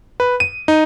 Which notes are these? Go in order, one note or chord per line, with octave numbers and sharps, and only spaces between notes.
B4
D#7
D#4